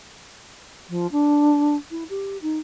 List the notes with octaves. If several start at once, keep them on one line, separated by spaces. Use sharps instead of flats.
F3
D4
E4
G4
D#4